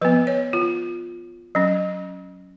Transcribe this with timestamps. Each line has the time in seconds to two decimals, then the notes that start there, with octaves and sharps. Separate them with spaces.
0.01 F3 B3 B4
0.27 C#5
0.53 F4
1.55 F#3 C#4